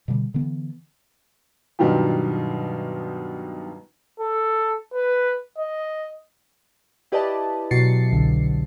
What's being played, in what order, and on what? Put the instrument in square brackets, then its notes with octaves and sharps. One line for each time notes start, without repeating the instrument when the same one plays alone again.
[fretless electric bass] B2 D3 G3
D3 E3 B3
[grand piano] G2 B2 D#3 F#3 F4 G4
[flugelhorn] A4
B4
D#5
[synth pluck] E4 G4 B4 D5 D#5 A5
B2 F#3 F#4 A6 C7 C#7
G1 C2 D3